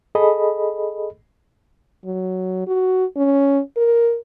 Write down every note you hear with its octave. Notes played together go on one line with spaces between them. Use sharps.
G#4 A4 D#5 B5
F#3
F#4
C#4
A#4